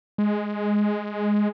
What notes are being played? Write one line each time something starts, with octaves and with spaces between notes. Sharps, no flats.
G#3